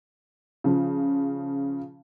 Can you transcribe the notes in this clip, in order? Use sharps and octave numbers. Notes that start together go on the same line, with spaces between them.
C#3 F3